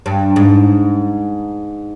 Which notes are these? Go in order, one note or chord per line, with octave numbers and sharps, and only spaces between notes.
G2
G#2